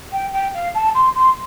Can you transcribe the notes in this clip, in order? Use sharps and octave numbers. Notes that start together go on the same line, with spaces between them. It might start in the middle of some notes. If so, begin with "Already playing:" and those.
G5
G5
F5
A5
C6
C6